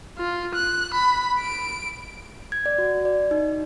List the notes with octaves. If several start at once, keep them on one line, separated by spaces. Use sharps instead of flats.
F4
F#6
B5
D7
G#6
D5
F#4
D5
D#4